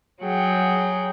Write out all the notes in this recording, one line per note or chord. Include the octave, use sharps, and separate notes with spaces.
F#3 G#4 F#5 G5